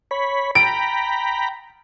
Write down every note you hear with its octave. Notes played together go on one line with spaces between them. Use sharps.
C#5 B5
G5 A#5 B5 D7